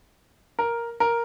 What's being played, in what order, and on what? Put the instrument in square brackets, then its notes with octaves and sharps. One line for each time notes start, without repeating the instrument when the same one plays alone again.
[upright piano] A#4
A#4